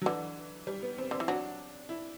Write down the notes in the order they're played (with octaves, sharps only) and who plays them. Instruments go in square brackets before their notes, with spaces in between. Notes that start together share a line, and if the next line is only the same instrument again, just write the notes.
[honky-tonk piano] F#3
[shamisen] D3 [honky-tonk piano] E3
[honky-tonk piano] G3
B3
C4
[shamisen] D3 [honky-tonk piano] C4
[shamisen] E3
[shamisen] F#3 [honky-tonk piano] D4
[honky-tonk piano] E4